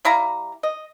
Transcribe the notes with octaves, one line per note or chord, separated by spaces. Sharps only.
G3 E4 F5 A#5
D#5